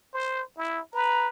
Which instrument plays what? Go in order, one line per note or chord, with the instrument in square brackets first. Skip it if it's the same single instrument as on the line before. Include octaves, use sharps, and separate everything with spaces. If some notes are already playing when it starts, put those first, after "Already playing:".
[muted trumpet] C5
E4
[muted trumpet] B4 [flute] A#5